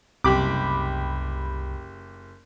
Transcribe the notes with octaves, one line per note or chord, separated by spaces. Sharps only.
F#1 C2 G4 B5 D6